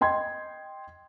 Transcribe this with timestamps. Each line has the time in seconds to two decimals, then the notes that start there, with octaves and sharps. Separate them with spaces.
0.01 D#5 G5 C6 G#6